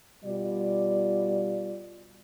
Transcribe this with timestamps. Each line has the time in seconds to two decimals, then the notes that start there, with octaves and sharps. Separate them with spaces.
0.25 B2 G3 F4 D5